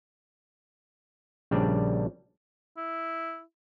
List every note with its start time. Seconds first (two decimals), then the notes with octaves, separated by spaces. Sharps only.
1.51 A#1 C#3 G3 D4 D5
2.77 E4